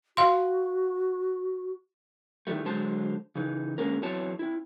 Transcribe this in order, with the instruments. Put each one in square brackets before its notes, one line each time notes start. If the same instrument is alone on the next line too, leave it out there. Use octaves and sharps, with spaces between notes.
[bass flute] F#4 [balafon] F5 C6
[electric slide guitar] D#3 E3 G3 A3
D3 F#3 G#3 C5 A5
C#3 E3 D#4
D3 G#3 A#3 C#4 A#4
E2 E3 F#3 C4 C#5 A5
C4 E4